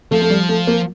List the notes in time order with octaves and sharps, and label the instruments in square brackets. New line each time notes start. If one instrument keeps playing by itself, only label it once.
[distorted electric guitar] F3 [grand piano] A3
[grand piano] A3
G3
A3
A#3